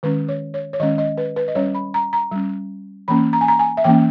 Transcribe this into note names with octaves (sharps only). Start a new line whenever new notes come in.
D#3 G#3 C#4 B4
C#5
C#5
C#5
D#3 G#3 C#4 D#5
D#5
B4
B4
D#5
G3 C#4 C#5
B5
A#5
A#5
G3 C#4
E3 A#3 C#4 B5
A#5
G#5
A#5
G#5
E5
E3 A#3 C#4 G5